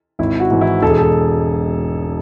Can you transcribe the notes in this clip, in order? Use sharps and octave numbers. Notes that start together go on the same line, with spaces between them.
G#1 E4
F#4
G#2 E3
E4
E1 A4
G#4
A4